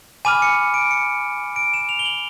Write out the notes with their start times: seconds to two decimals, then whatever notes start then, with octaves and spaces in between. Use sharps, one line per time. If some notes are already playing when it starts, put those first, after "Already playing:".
0.25 G#5 B5 D6 F6 D#7
0.42 C#7
0.74 D7
0.91 C#7
1.56 D7
1.74 E7
1.89 F7
1.99 G7
2.06 F#7